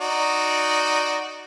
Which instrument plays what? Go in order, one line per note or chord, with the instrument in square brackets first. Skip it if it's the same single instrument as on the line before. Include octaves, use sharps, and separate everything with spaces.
[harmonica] D#4 F#4 D5